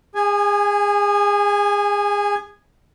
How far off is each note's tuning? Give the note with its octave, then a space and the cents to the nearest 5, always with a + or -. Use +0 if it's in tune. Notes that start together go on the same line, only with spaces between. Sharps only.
G#4 -30 G#5 +0